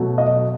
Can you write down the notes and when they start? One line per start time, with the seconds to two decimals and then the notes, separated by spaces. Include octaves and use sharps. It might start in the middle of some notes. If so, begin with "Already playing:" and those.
Already playing: B2 F#3 A3
0.18 D#5